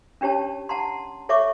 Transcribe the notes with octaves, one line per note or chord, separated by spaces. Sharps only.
C#4 D4 G4 C#5 A5
F#5 A5 A#5 C6
A4 C#5 E5 C#6 D6